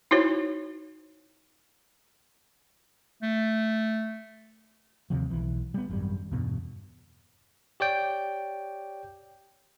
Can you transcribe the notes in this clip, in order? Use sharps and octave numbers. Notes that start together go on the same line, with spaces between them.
D#4 E4 F#4 C5 C#5
A3
D#2 C3 F3
B1 E3
G3 B3
G#1 F#2 C3 G3
E2 G2 B2
G4 C#5 D5 G5